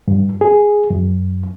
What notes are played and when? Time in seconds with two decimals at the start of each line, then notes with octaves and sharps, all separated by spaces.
0.08 G2
0.41 G#4
0.90 F#2